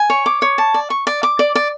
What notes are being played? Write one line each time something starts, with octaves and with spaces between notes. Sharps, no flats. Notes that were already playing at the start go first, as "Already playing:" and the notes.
Already playing: G#5
C#5
D6
C#5
A5
D5
C#6
D5
D6
D5
D5